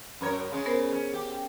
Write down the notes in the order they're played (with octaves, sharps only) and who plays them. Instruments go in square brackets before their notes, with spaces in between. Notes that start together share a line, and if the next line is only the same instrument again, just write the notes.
[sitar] F#2 A#4 C#5
C#3 G#3 C#4
[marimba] B3 A#4 C5
[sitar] C#4
G4
[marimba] G5